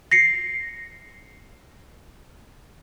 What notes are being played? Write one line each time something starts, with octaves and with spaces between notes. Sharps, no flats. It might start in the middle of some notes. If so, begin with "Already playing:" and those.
A#6 C7 C#7